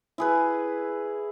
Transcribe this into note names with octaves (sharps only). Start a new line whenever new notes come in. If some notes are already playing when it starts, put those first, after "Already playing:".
E4 G#4 B4